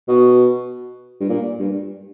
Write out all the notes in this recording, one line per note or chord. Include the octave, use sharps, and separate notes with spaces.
B2
G2
A#2
G2